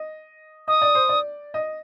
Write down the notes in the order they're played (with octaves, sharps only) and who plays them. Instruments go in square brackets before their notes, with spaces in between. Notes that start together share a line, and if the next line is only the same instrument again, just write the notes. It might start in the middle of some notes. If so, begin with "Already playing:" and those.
Already playing: [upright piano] D#5
[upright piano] D#5 [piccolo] D#6
[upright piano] D5
C5
D5
D#5